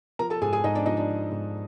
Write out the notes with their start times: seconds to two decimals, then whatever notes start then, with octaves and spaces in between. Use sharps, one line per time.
0.19 F3 A#4 A#5
0.30 A4 A5
0.42 G#2 G#4 G#5
0.53 G#4 G#5
0.64 G#2 D#4 D#5
0.75 D4 D5
0.86 F3 D#4 D#5
0.97 D4 D5
1.09 F3
1.31 G#2